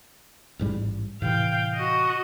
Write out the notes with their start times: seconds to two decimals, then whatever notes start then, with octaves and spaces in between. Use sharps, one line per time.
0.59 A1 G#2 G3
1.22 A2 C3 E3 F5 G5
1.75 F#4 D#5